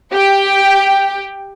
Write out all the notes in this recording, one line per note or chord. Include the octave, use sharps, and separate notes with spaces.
G4 G5